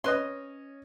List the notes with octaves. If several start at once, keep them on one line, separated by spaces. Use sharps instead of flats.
C#4 B4 D#5 C6